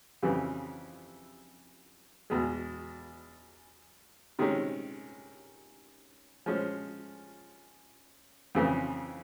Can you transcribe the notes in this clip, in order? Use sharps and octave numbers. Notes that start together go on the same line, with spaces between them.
F2 C#3 E3 G3
E2 B2 G#3
C3 D#3 G#3 C#4
F3 G#3 C#4
F2 C#3 E3